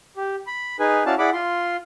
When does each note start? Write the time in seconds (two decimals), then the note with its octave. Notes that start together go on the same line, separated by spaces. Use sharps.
0.17 G4
0.47 B5
0.80 D#4 G#4 B4 G#5
1.06 C#4 E4 F#4 D5 F5 A5
1.19 E4 G#4 D5 F#5 B5 D6
1.33 F4 C6